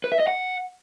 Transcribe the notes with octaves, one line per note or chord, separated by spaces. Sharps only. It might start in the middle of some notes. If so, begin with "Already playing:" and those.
B4
E5
D#5
F#5